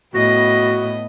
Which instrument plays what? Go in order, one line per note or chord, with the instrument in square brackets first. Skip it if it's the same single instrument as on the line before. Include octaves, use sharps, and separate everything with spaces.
[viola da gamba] A2 B3 D#5 [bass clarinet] F#4 [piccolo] A#6